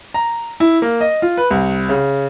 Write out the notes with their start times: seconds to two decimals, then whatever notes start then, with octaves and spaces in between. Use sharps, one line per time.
0.14 A#5
0.60 E4
0.82 A#3
1.01 D#5
1.22 F4
1.37 B4
1.50 C2
1.89 C#3